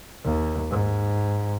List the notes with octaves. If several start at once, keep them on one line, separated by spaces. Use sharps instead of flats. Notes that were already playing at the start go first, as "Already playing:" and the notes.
D#2
G#2